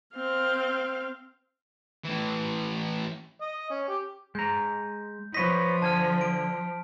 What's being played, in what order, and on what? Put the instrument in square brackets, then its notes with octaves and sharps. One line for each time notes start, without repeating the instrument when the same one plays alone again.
[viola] C4 F5
[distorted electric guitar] A2 E3
[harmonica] D#5
C#4
G4
[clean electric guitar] G#3 A#5 [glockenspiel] G6
[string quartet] F3 [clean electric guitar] B4 C#5 D#5 [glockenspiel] B6
[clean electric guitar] D3 G#5 [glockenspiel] A5 F6
[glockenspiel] D7